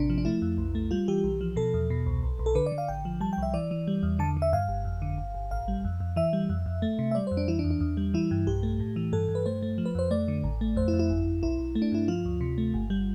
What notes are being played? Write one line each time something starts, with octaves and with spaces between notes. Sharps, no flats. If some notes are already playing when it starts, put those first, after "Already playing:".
Already playing: A1 C3 D4
F3
D4
A3 E4
F2
B1
A3
G3 F4
E3 G4
B1
F3
B2 A4
E2
B2
C2
B1
B1
A4
D3 B4
D5
D3
F5
A1 G5
F3
G3 A5
G5
C2 E5
E3 D5
E3
G3
E2
D3 A5
D3
E5
G2 F5
G1
F2
D3
G1
G1
A1 F5
G3
F2
F2
E3 E5
G3
F2
F2
A3
C3
E5
G3 D5
F2 C5
D4
E3 E4
D4
E2
D4
E2
G3
E3 E4
G2
B1 G4
A3
A2
E3
G2 A4
G2
B4
A3 C5
A3
F3
B4
F2 C5
A3 D5
D3
A1
A3
F2 C5
E4
F2
E4
G1
G1
B1 E4
B1
A3
D4
G2 E4
F3 F4
D2
C3
A3
G1
G3